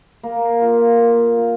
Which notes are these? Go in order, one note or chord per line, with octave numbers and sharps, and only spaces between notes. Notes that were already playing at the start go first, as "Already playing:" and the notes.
A#3
F4 A#4
A#3
F4 A#4